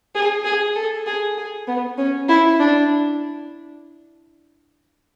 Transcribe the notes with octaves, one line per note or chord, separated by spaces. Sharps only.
G#4
G#4
A4
G#4
G#4
B3
C#4
E4
D4